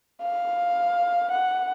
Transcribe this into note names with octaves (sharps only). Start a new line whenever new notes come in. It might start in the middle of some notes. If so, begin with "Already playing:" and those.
F5
F#5